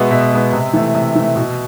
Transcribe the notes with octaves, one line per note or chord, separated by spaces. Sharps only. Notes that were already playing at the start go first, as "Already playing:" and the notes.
Already playing: B2 G#3 B3 E5
B2 E5
G#3 B3
C3
E3 A3
C3
E3 A3
B2